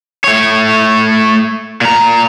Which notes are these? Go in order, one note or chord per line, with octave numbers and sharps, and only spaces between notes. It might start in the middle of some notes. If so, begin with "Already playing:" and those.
A3 C#5
A#2 A#5